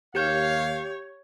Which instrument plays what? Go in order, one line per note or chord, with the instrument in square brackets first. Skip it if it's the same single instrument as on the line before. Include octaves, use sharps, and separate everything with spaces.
[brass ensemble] D#2 F5 [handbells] G4 G6 [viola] C#5